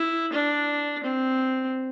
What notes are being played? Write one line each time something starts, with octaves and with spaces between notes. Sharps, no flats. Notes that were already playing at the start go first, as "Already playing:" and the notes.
Already playing: E4
D4
C4